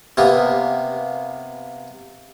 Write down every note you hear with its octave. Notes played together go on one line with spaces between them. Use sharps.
C3 A#3 B3